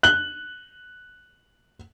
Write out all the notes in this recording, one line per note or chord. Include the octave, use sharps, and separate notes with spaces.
F#6 F#7 G7